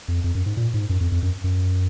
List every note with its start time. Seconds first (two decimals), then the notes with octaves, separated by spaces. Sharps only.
0.08 F2
0.24 F2
0.35 F#2
0.46 G#2
0.57 A#2
0.74 G#2
0.89 F#2
1.00 F2
1.12 F2
1.22 F#2
1.44 F#2